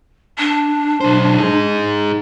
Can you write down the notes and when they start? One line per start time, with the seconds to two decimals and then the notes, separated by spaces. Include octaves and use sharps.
0.39 D4
1.00 B1 C5
1.38 D#4 G#4